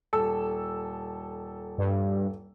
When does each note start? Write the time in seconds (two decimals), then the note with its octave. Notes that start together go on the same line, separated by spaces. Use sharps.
0.13 D#1 A4 E6
1.78 G2